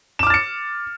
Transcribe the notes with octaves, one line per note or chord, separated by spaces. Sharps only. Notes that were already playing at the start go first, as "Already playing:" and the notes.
D6 F6 A6 C#7 E7